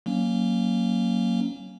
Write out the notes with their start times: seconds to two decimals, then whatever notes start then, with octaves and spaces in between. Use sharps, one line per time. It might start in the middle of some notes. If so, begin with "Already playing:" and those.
0.06 F#3 A#3 C#4